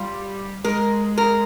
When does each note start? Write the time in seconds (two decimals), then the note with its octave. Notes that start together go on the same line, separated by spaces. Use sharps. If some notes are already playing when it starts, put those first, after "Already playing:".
Already playing: G3 F4
0.64 G#3 A#4
1.18 A#4